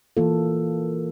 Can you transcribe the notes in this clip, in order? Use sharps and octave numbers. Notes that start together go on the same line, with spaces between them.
E3 A#3 F4 A4